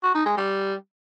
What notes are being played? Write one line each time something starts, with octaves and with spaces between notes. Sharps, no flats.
F#4
D#4
G#3
G3